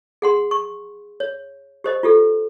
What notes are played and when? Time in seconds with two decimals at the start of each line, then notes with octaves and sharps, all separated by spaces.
0.22 G#4 F#5 C6
0.51 C#6
1.20 C#5
1.84 G4 C5 D#5
2.03 F4 G4 A4